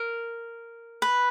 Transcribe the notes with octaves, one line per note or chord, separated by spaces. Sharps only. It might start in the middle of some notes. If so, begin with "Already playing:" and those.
Already playing: A#4
B4